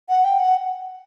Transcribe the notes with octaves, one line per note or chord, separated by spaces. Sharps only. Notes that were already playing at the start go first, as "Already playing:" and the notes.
F#5
G5
F#5